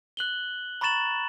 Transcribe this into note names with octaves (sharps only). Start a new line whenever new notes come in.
F#6 F#7 G7
A#5 B5 C#6 A6 E7 F#7